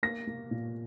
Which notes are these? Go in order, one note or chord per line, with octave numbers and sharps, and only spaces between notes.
A#3 A#6
A#3
A#2